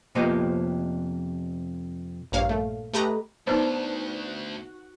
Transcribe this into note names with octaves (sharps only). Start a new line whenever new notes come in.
F2 C3 A#3 B3 G4 D#5
A#1 G2 A#3 C#5 F5
A3
A3 G4 B4 D#5 A#5
D2 B3 D#4 F#4 B4 C5 D5 A#5